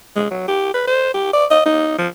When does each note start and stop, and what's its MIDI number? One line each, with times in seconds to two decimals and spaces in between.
0.16 0.28 56
0.31 0.43 54
0.48 0.72 67
0.74 0.86 71
0.88 1.12 72
1.14 1.28 67
1.33 1.46 74
1.51 1.65 75
1.66 1.95 63
1.98 2.08 53